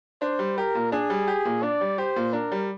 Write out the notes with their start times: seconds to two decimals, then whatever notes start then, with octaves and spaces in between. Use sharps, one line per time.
0.22 D4 C5
0.39 G3
0.58 G4 A#4
0.75 A#2
0.92 D4 G#4
1.10 G3
1.28 G4
1.45 A#2
1.63 D4 D5
1.81 G3
1.98 G4 C5
2.16 A#2
2.33 D4 A#4
2.52 G3